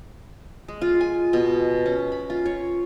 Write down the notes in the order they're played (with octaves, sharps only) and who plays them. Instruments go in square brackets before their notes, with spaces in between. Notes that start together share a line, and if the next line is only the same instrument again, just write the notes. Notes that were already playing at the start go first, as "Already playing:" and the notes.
[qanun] G#3
F4
G#5
B2
C#4
B5
F4
C#5